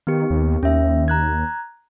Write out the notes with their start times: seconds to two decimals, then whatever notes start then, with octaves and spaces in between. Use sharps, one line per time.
0.07 D#3 B3 G4
0.30 D#2
0.63 D#2 C#4 E5
1.08 A#5 F#6 G#6